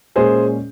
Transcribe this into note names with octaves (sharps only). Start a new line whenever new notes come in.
A#2 G#3 C#4 G#4 C5